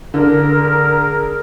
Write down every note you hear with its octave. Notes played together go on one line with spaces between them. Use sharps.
D3 G#4 A#4